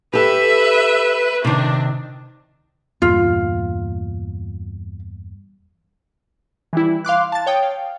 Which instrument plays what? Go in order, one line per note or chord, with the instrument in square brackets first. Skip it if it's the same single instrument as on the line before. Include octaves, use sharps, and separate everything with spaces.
[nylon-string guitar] G4 A4 [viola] B4 E5
[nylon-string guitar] C3 D#3 [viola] D4
[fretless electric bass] E2 G2 A#2 [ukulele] F4
[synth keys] E3 G3 E4
F5 C6 D6 F#6
A5 A6
C#5 G5 D#6
F5